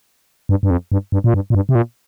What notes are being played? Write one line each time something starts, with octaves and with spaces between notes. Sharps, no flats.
G2
G2
F2
G2
G2
A#2
G2
A#2
G2
C3
A#2